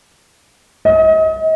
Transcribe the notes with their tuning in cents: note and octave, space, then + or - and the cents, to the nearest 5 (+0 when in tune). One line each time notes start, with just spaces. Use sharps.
D#5 +35